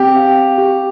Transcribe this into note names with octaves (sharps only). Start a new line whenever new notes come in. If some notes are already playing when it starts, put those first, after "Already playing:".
Already playing: C4 G4
F5
G4